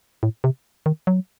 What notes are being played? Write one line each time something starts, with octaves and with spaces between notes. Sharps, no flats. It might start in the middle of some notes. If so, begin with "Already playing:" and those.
A2
C3
D#3
F#3